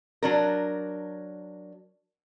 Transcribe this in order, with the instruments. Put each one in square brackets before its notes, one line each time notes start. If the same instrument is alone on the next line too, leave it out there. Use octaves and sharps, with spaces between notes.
[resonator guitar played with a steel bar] F#3 D4 A#4